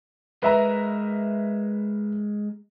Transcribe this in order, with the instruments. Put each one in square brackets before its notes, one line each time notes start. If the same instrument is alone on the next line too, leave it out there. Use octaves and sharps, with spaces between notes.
[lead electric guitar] G#3 A#4 [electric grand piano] B4 E5 A#5